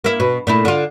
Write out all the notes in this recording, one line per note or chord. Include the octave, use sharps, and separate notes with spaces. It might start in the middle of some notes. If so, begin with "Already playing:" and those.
A#3 E4
B2
A#2 A3 E4
D3 F4